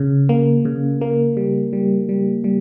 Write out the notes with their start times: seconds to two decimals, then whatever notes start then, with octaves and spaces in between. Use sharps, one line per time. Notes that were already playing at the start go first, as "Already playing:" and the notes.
Already playing: C#3
0.29 A#3
0.65 C#3
1.01 A#3
1.37 G3
1.73 G3
2.09 G3
2.44 G3